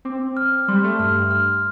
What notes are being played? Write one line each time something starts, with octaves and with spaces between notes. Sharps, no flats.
C4 D6
F6
G3 C6
A3
G2 F6
G2
F6